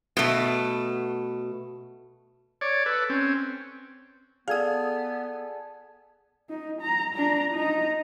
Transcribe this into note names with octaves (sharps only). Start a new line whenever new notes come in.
B2 A3
C#5 D5
A4 B4
C4 C#4
B3 G#4 A4 D5 F5 D#6 G#6
D#4
A#5
D4 A#5
D#4 A#5